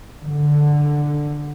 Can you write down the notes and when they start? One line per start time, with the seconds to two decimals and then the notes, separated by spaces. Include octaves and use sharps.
0.23 D3